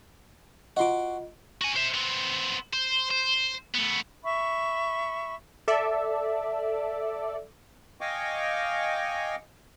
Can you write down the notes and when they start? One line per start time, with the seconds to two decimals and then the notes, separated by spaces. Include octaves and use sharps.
0.77 F4 F#4 D#5 C6 D6
1.62 F#4 G#5
1.76 C5 E5
1.94 B3 C4
2.73 C5
3.11 C5
3.75 A3 B3
4.24 E5 B5 C#6
5.68 A4 D5 E5
8.01 D#5 F5 G5 G#5 C#6 D6